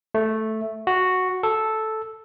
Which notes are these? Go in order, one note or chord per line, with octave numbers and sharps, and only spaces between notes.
A3
F#4
A4